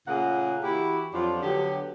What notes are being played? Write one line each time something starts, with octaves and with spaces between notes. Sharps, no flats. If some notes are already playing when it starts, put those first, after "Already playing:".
A#2 C#3 A3 A#3 G#4 F#5
E3 E4 F#4 G4
F2 F3 F#3 D4 F4 F#4
D3 F#3 B3 G4